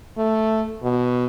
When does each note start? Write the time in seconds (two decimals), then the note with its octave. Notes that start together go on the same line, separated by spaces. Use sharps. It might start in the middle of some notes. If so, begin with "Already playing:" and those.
0.18 A3
0.83 B2